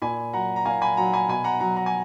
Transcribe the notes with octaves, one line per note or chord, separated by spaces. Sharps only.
A#2 G#5 B5
F#3 F#5 A#5
A#5
A#2 F5 G#5
G#5 B5
F#3 F#5 A#5
G#5 B5
B2 G#5 B5
F#5 A#5
F#3 F#5 A#5
F#5 A#5
G#5